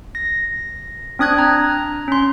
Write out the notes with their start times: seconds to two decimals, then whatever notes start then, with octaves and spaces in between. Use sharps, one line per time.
0.15 A#6
1.19 C4 D4 D#6 F#6 G#6
1.39 A#5
2.08 C#4 C6